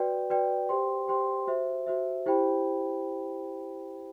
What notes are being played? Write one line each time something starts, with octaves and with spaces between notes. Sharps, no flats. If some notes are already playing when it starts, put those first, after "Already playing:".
Already playing: F#4 B4 D5 G5
F#4 B4 D5 G5
G4 C5 G5 C6
G4 C5 G5 C6
F#4 C5 E5
F#4 C5 E5
E4 G4 C5 G5 B5